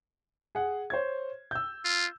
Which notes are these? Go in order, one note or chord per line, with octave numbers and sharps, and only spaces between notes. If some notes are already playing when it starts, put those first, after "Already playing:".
G#4 F#5
C5 C#5 G#6
E6 G6
F4